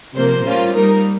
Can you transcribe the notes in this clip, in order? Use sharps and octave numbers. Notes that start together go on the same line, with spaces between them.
C3 F3 A#3 C5
A#2 G3 A#3 C#4 F4
G3 A#3 D#4 A#4